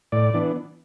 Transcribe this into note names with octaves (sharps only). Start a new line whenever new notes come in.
A2 D5
E3 B3 D4